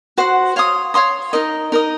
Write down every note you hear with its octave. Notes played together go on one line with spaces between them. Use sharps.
F#4 C5 F#5
C#5 F5 C6 D#6
C#5 F5 C6 D#6
D#4 A#4 D#5
D#4 A#4 D#5